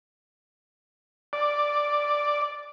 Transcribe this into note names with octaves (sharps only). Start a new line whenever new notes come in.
D5